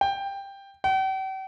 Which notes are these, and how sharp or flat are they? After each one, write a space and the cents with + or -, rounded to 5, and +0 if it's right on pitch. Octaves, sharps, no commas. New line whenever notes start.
G5 +10
G5 -45